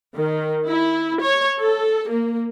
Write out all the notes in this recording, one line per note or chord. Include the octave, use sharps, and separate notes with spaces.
D#3
E4
C#5
A4
A#3